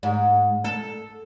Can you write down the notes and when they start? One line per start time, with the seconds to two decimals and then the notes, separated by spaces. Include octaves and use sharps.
0.03 G#2
0.64 A4